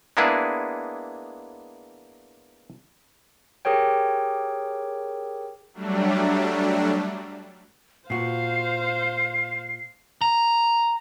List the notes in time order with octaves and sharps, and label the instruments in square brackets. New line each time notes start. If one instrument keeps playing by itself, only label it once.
[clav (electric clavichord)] G#3 A#3 B3 D4 E4 G#4
[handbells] G4 G#4 A#4 C#5 G5
[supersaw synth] F#3 G3 A3 D4
[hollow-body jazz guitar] A#2 F#4 [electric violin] C5 F5 [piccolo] C7
[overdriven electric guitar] A#5